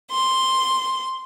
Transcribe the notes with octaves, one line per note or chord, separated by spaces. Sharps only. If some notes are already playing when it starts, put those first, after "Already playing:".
C6